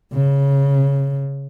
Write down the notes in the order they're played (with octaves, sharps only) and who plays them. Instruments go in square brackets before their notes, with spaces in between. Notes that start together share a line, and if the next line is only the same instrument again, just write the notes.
[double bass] C#3